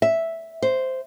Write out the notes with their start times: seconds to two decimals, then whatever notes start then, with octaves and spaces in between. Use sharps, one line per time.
0.02 E5
0.62 C5